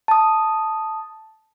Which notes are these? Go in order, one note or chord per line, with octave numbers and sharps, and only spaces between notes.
A5 D#6